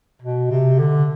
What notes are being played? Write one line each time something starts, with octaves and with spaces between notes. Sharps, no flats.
B2
C3
D3